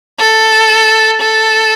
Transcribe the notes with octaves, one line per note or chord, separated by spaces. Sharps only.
A4
A4